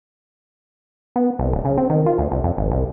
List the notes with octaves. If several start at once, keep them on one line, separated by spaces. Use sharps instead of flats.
B3
C2
D1
C#3
C4
D#3
F4
D2
C2
F2
G#1
C2